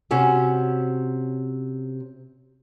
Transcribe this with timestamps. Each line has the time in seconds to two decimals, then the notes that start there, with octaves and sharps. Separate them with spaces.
0.11 C3 C4 C#4 F#4